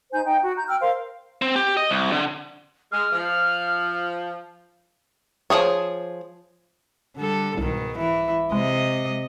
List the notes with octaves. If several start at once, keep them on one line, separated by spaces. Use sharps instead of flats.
D#4 C5 G#5 G6
D#4 G5
F#4
A#5 G6
G5 E6 F6
A#4 C5 F5 C6
C4
G4
D#5
C2
D3
G#3 F6
F3
F3 A3 G#4 C#5
D3 G3 A4
C2 G#2 B2 D#3
E3 E4
C3 G#3 D#5